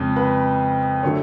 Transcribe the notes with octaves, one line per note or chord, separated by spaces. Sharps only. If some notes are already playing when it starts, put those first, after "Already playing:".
Already playing: F2 C#3 F3 G#3
B4
D3 F#3 A3 C#5